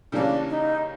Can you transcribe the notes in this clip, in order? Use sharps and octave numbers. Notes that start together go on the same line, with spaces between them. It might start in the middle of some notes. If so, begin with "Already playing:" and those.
C#3 E3 G3 A#3 C#4 D4
D#4